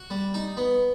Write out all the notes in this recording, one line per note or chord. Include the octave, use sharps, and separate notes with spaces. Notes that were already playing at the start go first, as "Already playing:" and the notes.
Already playing: F#4
G3
D#4
B3